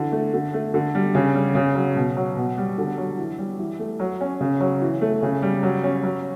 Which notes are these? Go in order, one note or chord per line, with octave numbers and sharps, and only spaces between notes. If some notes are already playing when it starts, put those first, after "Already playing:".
Already playing: D3 E3
A3
D3
A3
D3
G3
C#3
G3
C#3
F#3
B2
F#3
B2
G3
D3
F#3
E3
G3
E3
A3
F#3
C#4
C#3
F#3
E3
A3
C#3
G3
F#3
C#4
F#3